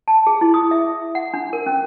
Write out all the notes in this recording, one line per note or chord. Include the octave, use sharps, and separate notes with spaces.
A5
G#4
E4
D#6
E5
F#5
D4
A#4
C#4